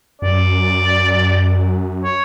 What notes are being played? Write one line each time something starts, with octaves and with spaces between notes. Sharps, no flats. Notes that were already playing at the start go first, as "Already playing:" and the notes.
F#2 D5
C#5